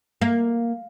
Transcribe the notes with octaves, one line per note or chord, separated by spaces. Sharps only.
A#3